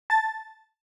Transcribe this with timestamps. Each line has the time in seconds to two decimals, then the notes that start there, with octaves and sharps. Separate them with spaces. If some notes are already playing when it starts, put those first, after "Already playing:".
0.10 A5 A6